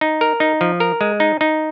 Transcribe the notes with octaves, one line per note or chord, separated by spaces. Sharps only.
D#4
A#4
D#4
F3
A#4
G#3
D#4
D#4